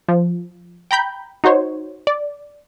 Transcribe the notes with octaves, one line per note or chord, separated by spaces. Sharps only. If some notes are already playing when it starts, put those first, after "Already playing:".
F3
G5 A#5 B5 G6
D#4 F#4 C5 C#5
D5